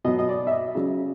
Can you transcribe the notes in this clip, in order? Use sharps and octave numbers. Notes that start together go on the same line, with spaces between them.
B2 F#3 D#5
D#5
D5
E5
D#5
C#3 F#3